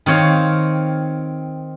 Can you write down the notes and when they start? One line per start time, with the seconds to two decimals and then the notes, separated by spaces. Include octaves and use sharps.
0.06 D#3 C4 C#5 F5